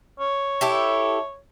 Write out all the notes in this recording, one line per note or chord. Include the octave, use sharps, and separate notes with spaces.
C#5
E4 G4 A4